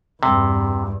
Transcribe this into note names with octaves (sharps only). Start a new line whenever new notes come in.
E2 G2 C3